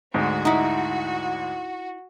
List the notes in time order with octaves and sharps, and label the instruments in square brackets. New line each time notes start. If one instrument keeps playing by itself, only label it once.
[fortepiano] D2 G#2 [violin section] F#4
[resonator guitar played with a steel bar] D#4 E4